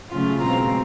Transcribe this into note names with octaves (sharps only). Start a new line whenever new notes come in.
C#3 F#3 A3 C#4 F4
B2 G#3 C4 F4 A#5